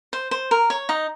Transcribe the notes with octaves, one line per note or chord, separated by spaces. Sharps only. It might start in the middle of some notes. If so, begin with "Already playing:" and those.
C5
C5
A#4
C#5
D#4 D#5